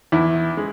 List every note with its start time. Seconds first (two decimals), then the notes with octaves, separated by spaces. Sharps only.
0.12 E2 E4
0.57 G#3